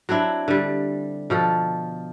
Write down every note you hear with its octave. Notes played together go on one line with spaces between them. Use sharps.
F#3 C4 D4 E4
D3 G3
B2 F3 A4